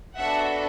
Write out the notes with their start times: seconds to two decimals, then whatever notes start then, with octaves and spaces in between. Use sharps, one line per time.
0.18 B3 D4 F#4 A4 E5 F#5